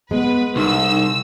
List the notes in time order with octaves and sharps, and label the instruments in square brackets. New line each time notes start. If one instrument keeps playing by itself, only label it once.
[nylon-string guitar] G#3 [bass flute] B3 [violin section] B4
[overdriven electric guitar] C2 [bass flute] D#4 [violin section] E6